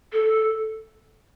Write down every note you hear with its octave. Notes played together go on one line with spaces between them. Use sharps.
A4